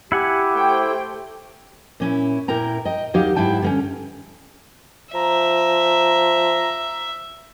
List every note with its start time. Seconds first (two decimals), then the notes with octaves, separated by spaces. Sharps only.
0.12 E4 G4 F#5 G#5
0.53 A3 C5 G5
2.00 A#2 C#4 E4
2.48 A#2 E4 A#4 G5 A#5
2.85 D#5 G5
3.14 D#2 F#3 D#4 G4 F5
3.36 G#2 F#3 E4 G5 A5
3.62 D3 A#3 C#4
5.14 F3 E5 A#5